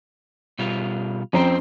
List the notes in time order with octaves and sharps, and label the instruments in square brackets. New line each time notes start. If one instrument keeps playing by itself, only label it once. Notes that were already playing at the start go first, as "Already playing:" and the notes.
[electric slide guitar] B2 G3 F4
[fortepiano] F2 C4 A#5 [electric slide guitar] C#4 C5 G5